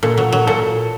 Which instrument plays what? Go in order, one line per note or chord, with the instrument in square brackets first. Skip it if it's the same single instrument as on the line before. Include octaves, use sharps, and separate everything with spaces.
[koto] A#2 [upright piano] A4
[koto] F#3
F#3
[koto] A#2 [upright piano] A4